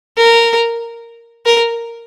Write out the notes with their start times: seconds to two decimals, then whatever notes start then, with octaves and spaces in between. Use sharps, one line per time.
0.17 A#4
1.46 A#4